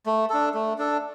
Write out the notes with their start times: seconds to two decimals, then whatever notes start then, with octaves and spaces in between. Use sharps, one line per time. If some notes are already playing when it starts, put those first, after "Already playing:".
0.06 A3
0.30 D4 A4
0.54 A3
0.79 D4 A4